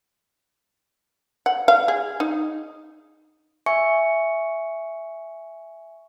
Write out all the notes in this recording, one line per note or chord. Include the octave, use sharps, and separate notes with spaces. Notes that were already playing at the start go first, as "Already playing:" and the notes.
F#5
F5
G#4
D#4
E5 G#5 C#6 C#7